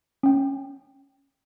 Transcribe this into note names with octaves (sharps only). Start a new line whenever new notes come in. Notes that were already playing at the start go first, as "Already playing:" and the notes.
C#4 G5